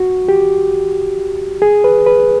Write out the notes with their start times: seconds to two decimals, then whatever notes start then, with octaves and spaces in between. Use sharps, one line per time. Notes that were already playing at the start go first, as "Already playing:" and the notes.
Already playing: F#4
0.29 G4
1.62 G#4
1.84 B4
2.06 B4